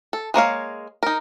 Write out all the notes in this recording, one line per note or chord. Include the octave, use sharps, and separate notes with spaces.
A4
G#3 A#3 C#5 F5
D#4 A#4